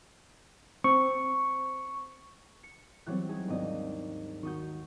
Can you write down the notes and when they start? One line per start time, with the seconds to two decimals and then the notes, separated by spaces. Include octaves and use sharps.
0.84 C4 C#6
2.64 C#7
3.06 E3 F#3 G3 C4 C#5 F#6
3.28 D#4 G#4 C#6
3.48 D#2 G#2 C4 D4 D#5
4.43 D#3 F#4 C#6 D#6 G6